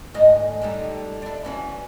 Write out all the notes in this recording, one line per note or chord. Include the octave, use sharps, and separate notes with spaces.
D2 G#2 D#5
D3 G3 D#4
D4 E4
E3 C#4 F#4